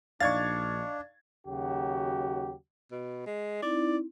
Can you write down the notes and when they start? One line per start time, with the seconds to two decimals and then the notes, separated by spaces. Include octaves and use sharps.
0.20 A#1 D4 D#4 D5 F5 C#6 G#6 A6
1.47 D#2 C#3 F#3 F#4 G4
2.91 B2
3.26 G#3
3.62 C4 D#4 E4 D5